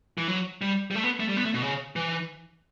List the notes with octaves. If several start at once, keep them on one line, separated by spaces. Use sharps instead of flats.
E3
F#3
G3
G3
A3
B3
A3
G3
B3
A3
B2
C#3
E3